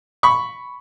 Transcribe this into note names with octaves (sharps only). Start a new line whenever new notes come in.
B5 C#6